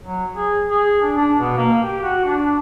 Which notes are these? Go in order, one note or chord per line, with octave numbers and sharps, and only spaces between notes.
F#3
G#4
G#4
D4
D4
B2
A#3
G4
F#4
D4